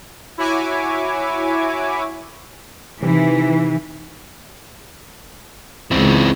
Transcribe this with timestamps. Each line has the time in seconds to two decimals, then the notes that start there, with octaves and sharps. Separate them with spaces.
0.38 E4 F#4 C#5 E5 G#5 D6
3.02 C3 D#3 E3
5.91 C#2 E3 C4